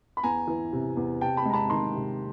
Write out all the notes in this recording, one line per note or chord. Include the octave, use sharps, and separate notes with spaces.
B5
E2 G#5 A#5
E3
C3
E2
C3 G5 A5
A5 B5
G#3 A#5
A5 B5
D#3 A#5 C6
C3